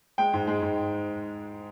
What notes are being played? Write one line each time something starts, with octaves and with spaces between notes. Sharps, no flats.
G#3 G5
G#2
G#3
G#2